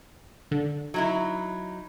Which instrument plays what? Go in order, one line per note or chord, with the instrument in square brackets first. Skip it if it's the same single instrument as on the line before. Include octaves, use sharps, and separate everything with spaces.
[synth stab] D3
[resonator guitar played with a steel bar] F#3 D#4 E4